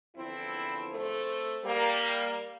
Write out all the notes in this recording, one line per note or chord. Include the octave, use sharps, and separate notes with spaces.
E2 D3 F3 C4 E4
A3 C4
G3 A#3